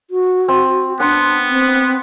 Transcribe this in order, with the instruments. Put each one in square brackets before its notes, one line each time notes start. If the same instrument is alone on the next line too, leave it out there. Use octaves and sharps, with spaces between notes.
[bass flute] F#4
[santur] C4
[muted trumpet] B3 [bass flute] D4 [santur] F#5 C6
[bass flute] C4